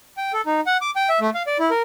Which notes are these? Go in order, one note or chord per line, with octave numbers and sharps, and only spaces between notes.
G5
A4
D#4
F#5
D6
G5
E5
A3
F5
D5
E4
A#4